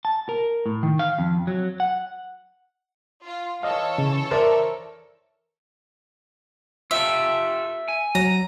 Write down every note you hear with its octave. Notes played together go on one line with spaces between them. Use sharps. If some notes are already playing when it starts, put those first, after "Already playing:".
A5
A#4
A2
D#3
F5
F2
F#3
F#5
F4
E3 A4 C#5 D#5 F5
C#3
A#4 C5 D5 E5
F4 G4 A4 E5
G#5
F#3 A#5